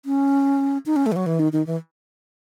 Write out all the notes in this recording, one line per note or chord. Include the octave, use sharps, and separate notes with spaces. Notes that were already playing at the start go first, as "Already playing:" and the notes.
C#4
D#4
C#4
A3
E3
F#3
E3
D#3
D#3
E3